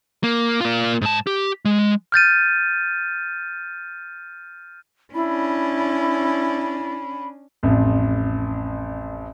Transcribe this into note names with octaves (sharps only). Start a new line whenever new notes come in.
A#3
A#3 F4
G#2 A5
G4
G#3
F6 G6 A6 D#7
C#4 D4 E4 B5
A1 F2